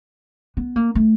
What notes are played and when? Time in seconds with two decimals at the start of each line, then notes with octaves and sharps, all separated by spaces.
0.57 B3
0.76 A#3
0.95 A3